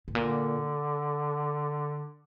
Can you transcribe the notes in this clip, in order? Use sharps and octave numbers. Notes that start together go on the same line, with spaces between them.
A2
A#2 D3